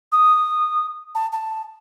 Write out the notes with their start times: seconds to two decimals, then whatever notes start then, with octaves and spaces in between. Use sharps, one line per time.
0.12 D#6
1.15 A5
1.32 A5